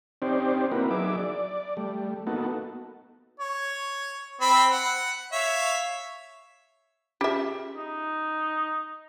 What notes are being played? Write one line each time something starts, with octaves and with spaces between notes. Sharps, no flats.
C4 C#4 D#4 G4 C5 D5
A#3 C4 E4 F#4 A#4 B4
F#3 D#4 G#4 E5 D6
D5
G3 A3
A#3 B3 D#4 F#4 A4
C#5
C4 B5
F#5
C#5 E5 F5
C#4 F4 G4 G#4 E5
D#4